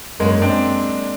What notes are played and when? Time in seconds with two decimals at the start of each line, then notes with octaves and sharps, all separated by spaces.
0.20 F#2 G#3 A#3
0.42 C4 D4